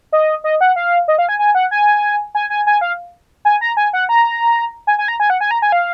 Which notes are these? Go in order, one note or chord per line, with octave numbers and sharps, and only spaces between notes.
D#5
D#5
F#5
F5
D#5
F5
G#5
G#5
F#5
G#5
G#5
G#5
G#5
F5
G#5
A#5
G#5
F#5
A#5
G#5
G#5
A#5
G#5
F#5
G#5
A#5
G#5
F5